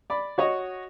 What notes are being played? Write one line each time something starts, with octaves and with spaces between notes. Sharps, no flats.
D5 B5
F#4 C#5 D#5